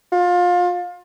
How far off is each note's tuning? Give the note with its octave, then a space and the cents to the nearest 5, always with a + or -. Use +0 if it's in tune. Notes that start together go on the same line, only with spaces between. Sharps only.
F4 +25